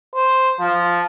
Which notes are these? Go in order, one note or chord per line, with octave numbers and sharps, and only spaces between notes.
C5
F3